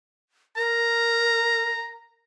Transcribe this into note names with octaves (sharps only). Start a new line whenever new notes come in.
A#4 A#5